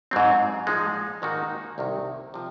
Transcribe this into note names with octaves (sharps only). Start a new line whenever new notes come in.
G#2 F#3 C4
A#2 F3 G#3 D#4
G#2 D#3 A#3 D#4 F#4
C2 C3 D#3
C3 F3